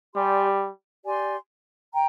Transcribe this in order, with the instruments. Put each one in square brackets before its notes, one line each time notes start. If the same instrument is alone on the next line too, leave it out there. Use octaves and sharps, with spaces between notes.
[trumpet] G3 [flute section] G4 D5 G#5 C6
[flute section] G4 D5 G#5 C6
G5 A#5